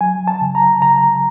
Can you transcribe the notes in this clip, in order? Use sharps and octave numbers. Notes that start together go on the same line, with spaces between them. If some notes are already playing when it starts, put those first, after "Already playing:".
F#3 G#5
A5
C#3
A#5
C#3 A#5